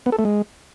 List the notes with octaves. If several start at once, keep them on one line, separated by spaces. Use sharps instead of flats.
B3
A4
A3
G#3